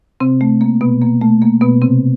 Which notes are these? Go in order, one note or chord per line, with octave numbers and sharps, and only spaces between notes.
C3 C4
A3
A#3
B2 B3
A#3
A3
A#3
B2 B3
C3 C4